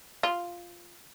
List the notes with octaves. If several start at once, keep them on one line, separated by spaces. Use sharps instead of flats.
F4